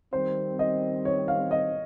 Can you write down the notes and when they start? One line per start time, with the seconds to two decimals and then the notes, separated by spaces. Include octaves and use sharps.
0.13 D#3 G3 C4 C5
0.59 D#5
1.05 C#5
1.28 F5
1.51 D#5